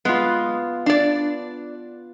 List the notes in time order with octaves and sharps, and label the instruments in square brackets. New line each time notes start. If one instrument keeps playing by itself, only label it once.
[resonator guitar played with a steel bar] G#3 [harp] B3 F4
[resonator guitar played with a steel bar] D4 D5